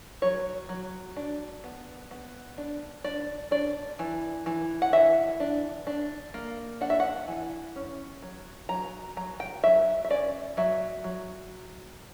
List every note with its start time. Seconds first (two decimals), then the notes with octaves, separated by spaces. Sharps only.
0.22 F#3 C#5
0.69 F#3
1.16 D4
1.64 B3
2.11 B3
2.58 D4
3.04 D4 D5
3.51 D4 D5
3.99 E3
4.46 E3
4.82 F#5
4.93 E3 E5
5.40 D4
5.87 D4
6.34 A#3
6.81 D4 F#5
6.90 E5
7.00 F#5
7.28 E3
7.76 C#4
8.22 F#3
8.69 F#3 A#5
9.17 F#3 A#5
9.40 G5
9.64 F#3 E5
10.05 E5
10.10 C#4 D5
10.57 F#3 E5
11.04 F#3